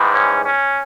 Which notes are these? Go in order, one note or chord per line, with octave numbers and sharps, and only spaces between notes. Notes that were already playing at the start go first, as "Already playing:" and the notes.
Already playing: G#2 E3 G3 B3
C#4
C#4